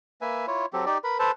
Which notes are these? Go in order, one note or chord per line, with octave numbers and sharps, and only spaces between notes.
A#3 B4 E5 G#5
E4 F4 C#5
F#3 C4 G4 A4
D#4 G4 D5
A#4 B4 B5
A4 B4 C5 A5